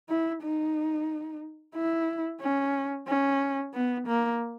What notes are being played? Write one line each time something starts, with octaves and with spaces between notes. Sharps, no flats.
E4
D#4
E4
C#4
C#4
B3
A#3